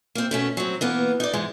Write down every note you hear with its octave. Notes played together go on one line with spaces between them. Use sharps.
A#3 C4
B2 A3 C#4
F#3 C4
E3 A#3 B3
D#4 D5
G#2 E3 G#3